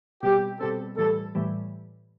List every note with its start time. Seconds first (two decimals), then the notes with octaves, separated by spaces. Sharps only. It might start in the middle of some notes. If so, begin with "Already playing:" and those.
0.23 B2 G3 C4 G4
0.60 B2 G3 C4 A4
0.97 A2 E3 G3 A4
1.35 A2 E3 G3